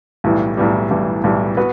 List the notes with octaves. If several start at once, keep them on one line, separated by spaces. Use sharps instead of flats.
B1 A2 E3 G3
B1 A2 E3 G3
B1 A2 E3 G3
B1 A2 E3 G3
B3 F#4 B4